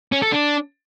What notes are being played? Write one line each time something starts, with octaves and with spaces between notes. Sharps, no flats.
C#4
A4
D4